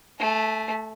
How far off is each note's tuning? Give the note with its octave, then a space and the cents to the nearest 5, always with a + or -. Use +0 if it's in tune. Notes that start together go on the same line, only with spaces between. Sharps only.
A3 -5 G#5 +45